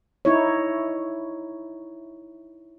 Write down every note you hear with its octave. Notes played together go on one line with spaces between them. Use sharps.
D#4 E4 C#5